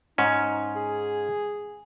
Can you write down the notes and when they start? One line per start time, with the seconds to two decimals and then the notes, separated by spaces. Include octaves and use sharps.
0.18 G#2 C#4 D#4
0.76 G#4